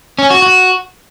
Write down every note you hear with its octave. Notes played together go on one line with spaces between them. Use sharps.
C#4
F#4
F#4